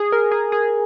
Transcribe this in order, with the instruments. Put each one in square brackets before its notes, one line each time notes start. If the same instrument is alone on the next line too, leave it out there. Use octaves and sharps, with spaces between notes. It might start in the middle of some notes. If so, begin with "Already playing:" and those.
Already playing: [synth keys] G#4
A#4
G#4
G#4